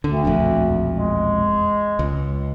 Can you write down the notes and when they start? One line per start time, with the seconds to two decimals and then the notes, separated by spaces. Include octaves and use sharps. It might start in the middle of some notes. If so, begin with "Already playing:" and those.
0.04 D2 D3
0.25 E1 A#1 F2
0.91 G#3
1.99 C#2